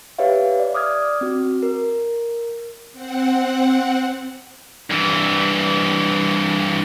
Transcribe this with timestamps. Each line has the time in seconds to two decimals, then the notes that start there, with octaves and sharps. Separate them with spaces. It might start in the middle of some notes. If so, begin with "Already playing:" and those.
0.19 G4 B4 C#5 E5 F5
0.60 D5
0.74 D6 D#6 F6 G#6
1.21 C4 F#4
1.63 A#4
2.93 C4 F#5
4.91 G2 E3